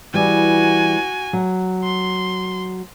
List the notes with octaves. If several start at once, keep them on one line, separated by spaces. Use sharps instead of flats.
E3 G3 F#4 G#5
F#3
C6